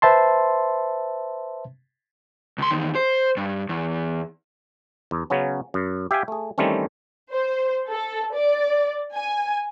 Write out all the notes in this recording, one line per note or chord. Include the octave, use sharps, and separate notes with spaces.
B4 C5 E5 A5 C6
C#2 C6
E2 D#3
C5
G2
E2
E2
C#3 F#3 B3 C#4
F#2
G4 E5 F5 G5 G#5
A3 G#4
D#3 E3 G3 A3 C4 C#4
C5
A4
D5
G#5